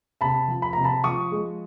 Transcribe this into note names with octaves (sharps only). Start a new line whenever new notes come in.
C3 A5 B5
F3
B5
C3 A#5
A5 B5
F3 C#6 D#6
G#3